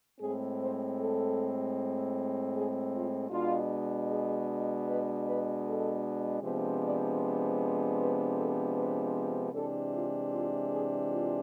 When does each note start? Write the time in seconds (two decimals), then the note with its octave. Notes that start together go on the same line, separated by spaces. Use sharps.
0.19 A2 G#3 C4 G#4
0.58 C5
0.97 A4
2.52 G#4
2.91 F4
3.30 B2 G#3 D4 F4
4.08 G#4
4.86 B4
5.25 B4
5.64 A4
6.41 C3 F3 G#3 B3 D4 B4
6.80 D5
7.19 C5
7.98 B4
8.35 A4
8.74 B4
9.52 C3 E3 G#3 D4 A4
9.91 F4
10.31 F4
10.70 G#4
11.08 F4